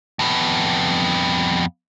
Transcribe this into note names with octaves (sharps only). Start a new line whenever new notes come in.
F2 B3